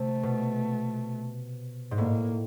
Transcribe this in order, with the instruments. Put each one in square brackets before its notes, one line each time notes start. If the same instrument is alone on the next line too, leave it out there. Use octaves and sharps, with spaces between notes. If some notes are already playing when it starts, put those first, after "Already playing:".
Already playing: [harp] C3 [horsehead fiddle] A3
[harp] B2
G#2
[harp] A2 [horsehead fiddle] A#3